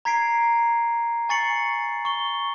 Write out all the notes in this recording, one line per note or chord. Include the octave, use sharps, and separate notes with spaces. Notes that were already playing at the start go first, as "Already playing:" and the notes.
A#5 G#6 B6 C7 D7
G#5 C#6 A6 C7 C#7 F#7
C#6 G7